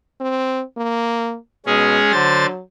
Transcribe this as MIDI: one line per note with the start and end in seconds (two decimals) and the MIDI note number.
0.20 0.62 60
0.77 1.36 58
1.66 2.00 47
1.66 2.12 56
1.66 2.12 61
1.66 2.12 68
2.12 2.46 50
2.12 2.60 54
2.12 2.46 72
2.12 2.46 93